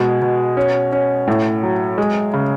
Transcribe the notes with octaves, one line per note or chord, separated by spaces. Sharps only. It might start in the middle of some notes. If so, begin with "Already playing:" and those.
Already playing: B2 G#3
B2
C#4
C#4
A2
F#3
G#3
C#3